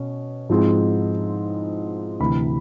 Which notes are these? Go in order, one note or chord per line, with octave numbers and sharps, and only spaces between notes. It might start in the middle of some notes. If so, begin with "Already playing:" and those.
Already playing: B2 C#4
G#2 F3 G#3 C4 E4
D2 C3 E3 B5